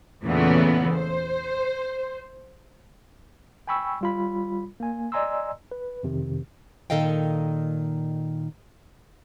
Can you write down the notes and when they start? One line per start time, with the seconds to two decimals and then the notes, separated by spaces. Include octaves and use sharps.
0.23 E2 A#2 C#3 E3 A3 B3
0.95 C5
3.67 G5 G#5 B5 C#6 E6
4.01 G3 F4 B5
4.80 A#3 G#5
5.12 D5 D#5 G#5 A#5 C6 E6
5.71 B4
6.03 F2 C3 D#3
6.90 A#2 D#3 A4 D#5 F5 G5